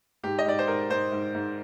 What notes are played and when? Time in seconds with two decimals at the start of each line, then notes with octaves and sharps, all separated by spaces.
0.24 G#2 G4
0.39 D#5
0.46 G#2 D5
0.59 C5
0.68 G#2 A#4
0.90 G#2 C5
1.12 G#2
1.35 G#2